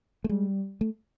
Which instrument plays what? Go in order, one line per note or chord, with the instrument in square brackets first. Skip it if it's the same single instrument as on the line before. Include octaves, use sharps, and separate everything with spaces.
[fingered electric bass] A3
[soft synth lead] G3 [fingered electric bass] G#3
[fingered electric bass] A3